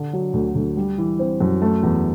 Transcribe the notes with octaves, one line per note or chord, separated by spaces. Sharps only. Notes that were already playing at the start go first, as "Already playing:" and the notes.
Already playing: D3
F#3
D2
D2
G3
E3
C4
F#2
A3
E2